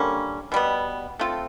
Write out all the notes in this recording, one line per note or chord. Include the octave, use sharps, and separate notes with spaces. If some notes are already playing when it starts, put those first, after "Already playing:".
Already playing: D3 G3 A#3 C#4
B2 G3 B3
A3 C4 F4 A4